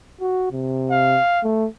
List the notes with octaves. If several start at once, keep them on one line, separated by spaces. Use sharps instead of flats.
F#4
C3
F5
A3